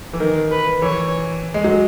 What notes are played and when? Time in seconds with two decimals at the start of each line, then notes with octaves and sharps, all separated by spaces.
0.13 E3
0.20 D#3 A#4
0.51 B4
0.82 E3 C#5
1.54 G#3
1.64 F#3